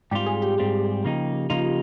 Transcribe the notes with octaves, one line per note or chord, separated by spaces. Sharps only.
G#2 G3 C4 F4 G4
G#4
G4
G#2 G3 C4 F4
C#3 F3 A#3 D#4
C#3 F3 A#3 D#4 F4